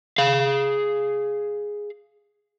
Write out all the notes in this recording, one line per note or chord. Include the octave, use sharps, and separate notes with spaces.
G#4 F5